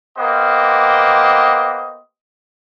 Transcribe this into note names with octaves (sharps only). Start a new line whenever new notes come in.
A#3 B3 G4 C5 D#5